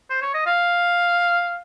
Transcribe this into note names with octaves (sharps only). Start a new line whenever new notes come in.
C5
C#5
D#5
F5